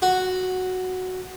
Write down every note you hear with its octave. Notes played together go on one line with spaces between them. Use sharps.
F#4